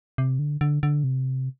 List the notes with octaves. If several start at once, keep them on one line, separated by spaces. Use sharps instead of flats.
C3
D3
D3
D3
C3